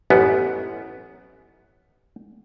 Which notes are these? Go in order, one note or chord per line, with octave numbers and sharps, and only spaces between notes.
A1 F#2 B3